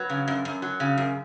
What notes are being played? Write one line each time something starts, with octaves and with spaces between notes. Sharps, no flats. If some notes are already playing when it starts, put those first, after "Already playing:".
Already playing: F#3 B4
C#3
F#2
F#2
F#3
C#3
F#2